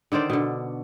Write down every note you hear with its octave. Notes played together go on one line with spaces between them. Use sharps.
D3 D#3 C5 D5
B2 D3